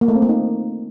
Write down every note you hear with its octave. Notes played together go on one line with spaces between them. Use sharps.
A#3
A3
C4
A#3
D#4